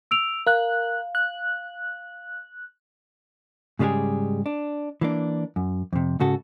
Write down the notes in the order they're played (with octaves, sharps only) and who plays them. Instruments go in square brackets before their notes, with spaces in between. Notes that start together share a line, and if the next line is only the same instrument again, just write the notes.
[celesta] E6 D7 F7
[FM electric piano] A#4 F#6 [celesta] F5
[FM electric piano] F#6
[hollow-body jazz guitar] G#2 C#3 G3 G#3 G4 G#4
D4
E3 A#3 D4
F#2
F2 C3
G#2 C#3 F#4 A4